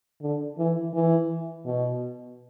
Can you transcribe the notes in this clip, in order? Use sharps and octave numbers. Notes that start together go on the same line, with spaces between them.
D3
E3
E3
B2